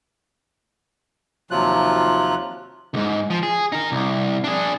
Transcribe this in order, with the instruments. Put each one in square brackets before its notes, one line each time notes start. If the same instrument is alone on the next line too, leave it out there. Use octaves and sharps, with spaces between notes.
[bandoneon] D#2 C3 F3 F#3 F4 F#6
[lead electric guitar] C#2 G#2
F3
G#4
D#4 A#4
C2
D4 G#4